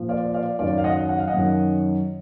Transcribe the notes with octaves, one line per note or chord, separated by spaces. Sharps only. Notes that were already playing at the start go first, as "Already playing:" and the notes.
Already playing: A#2 F3
D5 F5
D5 F5
F#2 D#3 F#3 D5 F5
F5
D#5 F#5
F#5
F5
D#5 F#5
F#2 D#3 F#3